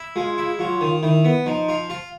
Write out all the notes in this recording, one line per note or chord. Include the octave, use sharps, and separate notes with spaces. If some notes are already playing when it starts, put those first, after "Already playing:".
Already playing: E4
G#3 F4
E4
F#3 F4
D#3
D#3 E4
B3
F3 D#4
F4
F4